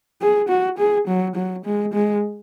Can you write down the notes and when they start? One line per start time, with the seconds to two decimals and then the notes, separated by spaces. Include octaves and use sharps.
0.21 G#4
0.49 F#4
0.78 G#4
1.08 F#3
1.36 F#3
1.65 G#3
1.93 G#3